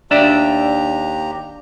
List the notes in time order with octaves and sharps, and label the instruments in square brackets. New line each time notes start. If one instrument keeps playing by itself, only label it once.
[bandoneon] D#2 G4 A#5 [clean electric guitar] D4 D5 E5